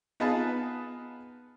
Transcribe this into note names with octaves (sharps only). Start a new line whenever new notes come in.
B3 D#4 F4 G#4 B4 A5